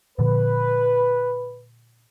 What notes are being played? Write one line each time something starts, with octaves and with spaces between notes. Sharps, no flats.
A#2 D3 F3 B4